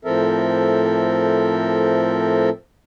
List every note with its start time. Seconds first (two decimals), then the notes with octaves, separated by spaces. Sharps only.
0.05 A2 F3 C4 A4 A#4 E5